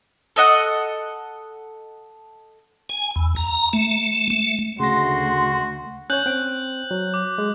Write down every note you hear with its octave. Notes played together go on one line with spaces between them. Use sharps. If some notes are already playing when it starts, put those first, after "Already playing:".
A4 D#5 F#5
G#5
E2
A#5
A3
A3
D2 C#3 A3 F#4 C6 A#6
C#4 C#5 F#6 G6 F#7
C4 G5
F#3
D6
G#3